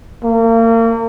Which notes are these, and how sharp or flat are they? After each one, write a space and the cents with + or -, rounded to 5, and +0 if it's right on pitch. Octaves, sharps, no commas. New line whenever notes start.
A#3 -35